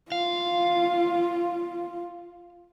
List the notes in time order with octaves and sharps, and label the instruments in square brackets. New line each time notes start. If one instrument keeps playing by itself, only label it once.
[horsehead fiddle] F4 [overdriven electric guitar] F5